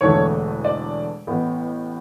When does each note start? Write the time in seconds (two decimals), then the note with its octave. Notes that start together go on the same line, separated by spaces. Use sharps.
0.01 E1 E2 D3 A3 D4 C#5
0.65 D5
1.27 A1 A2 E3 B3